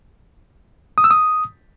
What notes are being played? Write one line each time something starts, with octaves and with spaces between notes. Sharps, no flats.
D#6
E6
D#6